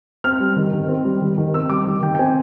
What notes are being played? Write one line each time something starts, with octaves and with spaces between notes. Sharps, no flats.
C4 F6
G3
D#3
D#3
C4
G3
D#3
D#3
C4 E6
G3 D6
D#3
D#3 G5
G5
C4 G#5